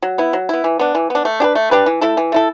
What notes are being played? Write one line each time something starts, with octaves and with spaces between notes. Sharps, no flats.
F#3
B3 E4
F#3
B3 E4
E3
B3 D4
E3
B3 D4
A3
D4 G4 B4
A3
D4 G4 B4
E3
A3 E4 A4
E3
A3 E4 A4